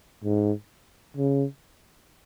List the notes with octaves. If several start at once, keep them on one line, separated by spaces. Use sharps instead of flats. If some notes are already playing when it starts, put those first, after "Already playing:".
G#2
C#3